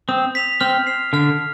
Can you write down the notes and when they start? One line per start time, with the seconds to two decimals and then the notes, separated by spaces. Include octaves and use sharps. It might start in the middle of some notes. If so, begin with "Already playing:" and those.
0.08 C4 D#6
0.35 B6 F7
0.61 C4 F6
0.87 C7 F7
1.13 D3 F6